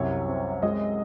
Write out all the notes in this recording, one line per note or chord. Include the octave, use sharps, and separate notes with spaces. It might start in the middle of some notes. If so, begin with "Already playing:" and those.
Already playing: C2 F#2 C3 C#5
C4
G#3 D#5